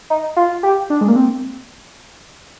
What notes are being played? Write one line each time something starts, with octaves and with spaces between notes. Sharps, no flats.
D#4
F4
G4
D4
G#3
A#3
C4